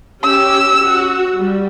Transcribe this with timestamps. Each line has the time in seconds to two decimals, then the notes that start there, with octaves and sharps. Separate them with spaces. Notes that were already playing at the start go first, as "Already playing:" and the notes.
0.23 C#4 G4 E6
0.84 F#4
1.37 G3